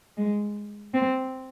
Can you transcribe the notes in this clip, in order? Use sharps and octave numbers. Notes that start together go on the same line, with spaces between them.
G#3
C4